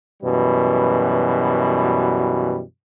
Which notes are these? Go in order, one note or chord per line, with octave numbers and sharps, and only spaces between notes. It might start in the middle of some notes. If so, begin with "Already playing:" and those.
F#2 B2 E3 G3